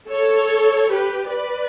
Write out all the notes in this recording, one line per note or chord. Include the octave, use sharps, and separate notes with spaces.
A4 C#5
G4 B4
B4 D5